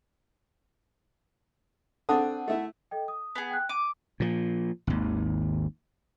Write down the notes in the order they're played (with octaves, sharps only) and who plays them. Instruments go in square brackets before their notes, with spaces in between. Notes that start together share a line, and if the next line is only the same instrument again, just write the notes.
[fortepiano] C4 D4 D#6 [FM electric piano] A4 F#5
[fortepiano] A3 E4
[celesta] A4 D#5 G5
D#6
[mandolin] B3 G#4
[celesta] G5 F#6
[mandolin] D6 [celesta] D#7
[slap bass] A#2 F3
G#1 D#2